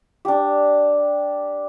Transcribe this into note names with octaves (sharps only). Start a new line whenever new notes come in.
D4 G4